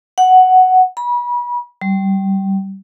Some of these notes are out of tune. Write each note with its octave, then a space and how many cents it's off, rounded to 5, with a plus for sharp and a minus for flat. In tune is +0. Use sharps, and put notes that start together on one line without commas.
F#5 +5
B5 -35
G3 -15